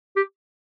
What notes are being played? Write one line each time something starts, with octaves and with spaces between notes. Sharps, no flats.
G4